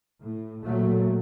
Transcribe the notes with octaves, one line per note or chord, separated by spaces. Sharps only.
A2
A#2 F#3 A3